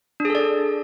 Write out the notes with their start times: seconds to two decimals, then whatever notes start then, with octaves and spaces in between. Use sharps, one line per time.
0.20 D4
0.25 G#4
0.30 A4
0.35 D5